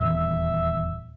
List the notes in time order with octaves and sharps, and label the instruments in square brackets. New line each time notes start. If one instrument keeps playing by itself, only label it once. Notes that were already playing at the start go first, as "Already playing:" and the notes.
[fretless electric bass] D#1 E2 [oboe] E5